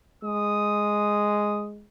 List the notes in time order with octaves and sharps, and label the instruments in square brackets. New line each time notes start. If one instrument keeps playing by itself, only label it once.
[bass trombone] G#3 [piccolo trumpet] D#6